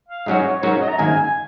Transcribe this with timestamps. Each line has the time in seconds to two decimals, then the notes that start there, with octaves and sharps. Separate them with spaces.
0.09 F5
0.26 G#2 F#3 C#4 F#4 D#5
0.44 C#5
0.62 G#2 F#3 C#4 F#4 A#4
0.81 D#5
0.89 A#5
0.98 G#1 F#2 D#3 A#3 G#5
1.16 G#5